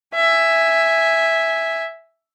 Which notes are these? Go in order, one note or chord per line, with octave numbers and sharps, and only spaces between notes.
E5 G#5